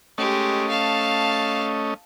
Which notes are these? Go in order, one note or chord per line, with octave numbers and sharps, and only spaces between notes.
G#3 A3 C#4 G4 D#5
F5 A5